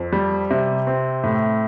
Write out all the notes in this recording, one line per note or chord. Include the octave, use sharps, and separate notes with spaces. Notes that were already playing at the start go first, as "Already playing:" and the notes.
Already playing: F2
G3
C3
C4
A2